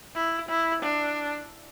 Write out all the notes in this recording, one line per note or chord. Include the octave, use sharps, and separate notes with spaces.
E4
E4
D4